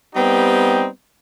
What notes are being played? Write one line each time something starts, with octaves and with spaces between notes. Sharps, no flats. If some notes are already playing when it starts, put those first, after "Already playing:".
G3 B3 C4 D#4 G4